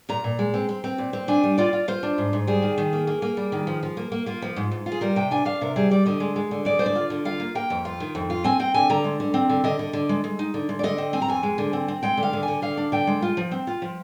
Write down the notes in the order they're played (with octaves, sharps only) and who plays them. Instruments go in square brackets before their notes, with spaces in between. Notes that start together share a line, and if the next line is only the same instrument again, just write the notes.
[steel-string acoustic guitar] A#2 A#5
A#2
G#3
C4
C4
C4
A#2
C4
D4 G#5
G3
F4 D5
F4
F4 C5
D4
G#2
G#2
G3 G#4
D#3
D#3
A#3
A#3
A#3
G3
D#3
F3
F3
A#3
A#3
A#3 F4
F3
G#2
G#2
F4
G#4
G3 A#4
C3 G5
D4 G#5
D4 F5
C3 A#4
G3 G#4
G3 D5
D3 D#5
G#3
G#3
D3
G#3 D5
D3 C5
D5
F4
D3
F4 F5
A#3
A#3 G5
F2
F4
D#3
F2
F4
C4 G#5
C4 G5
D3 G#5
D3 A#5
G#3
D3
C4
D3
D3 D#5
D3
D3
G#3
G#3
D#4
D3
G#3
D5
D3 D#5
C4
C4 G#5
A#5
F2 G#5
G#3
D3
C4
C4
G#3 G5
D3
F5
D3
G#5
D3
D3 F5
D4
D3 G5
G#3
F4
F3
C4
F4
F3